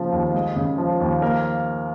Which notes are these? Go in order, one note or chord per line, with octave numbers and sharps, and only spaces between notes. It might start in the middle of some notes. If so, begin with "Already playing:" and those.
Already playing: C#3 F3 A#3
D#2
G#3
C#3
F3
D#2
A#3 A#4